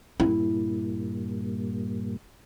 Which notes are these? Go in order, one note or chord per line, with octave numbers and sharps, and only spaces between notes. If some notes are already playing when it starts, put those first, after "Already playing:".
G2 A#2 E4